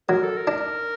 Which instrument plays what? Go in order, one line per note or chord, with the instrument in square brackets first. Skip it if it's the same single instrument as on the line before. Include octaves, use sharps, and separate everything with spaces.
[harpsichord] F#3 [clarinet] A#4
[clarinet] A4
A#4
[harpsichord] D4